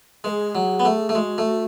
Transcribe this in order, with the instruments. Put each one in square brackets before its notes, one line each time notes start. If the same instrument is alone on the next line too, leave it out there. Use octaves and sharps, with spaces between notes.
[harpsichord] G#3 [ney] B4
[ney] G#4
[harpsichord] F#3
B3
A3
A3
[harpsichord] G#3 [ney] F#4
[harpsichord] A3